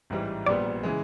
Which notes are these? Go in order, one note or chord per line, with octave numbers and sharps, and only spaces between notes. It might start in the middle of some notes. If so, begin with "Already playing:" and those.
A1 G#2 E3 G3
A#1 A#2 G3 B3 D5
C#3 E3 G#3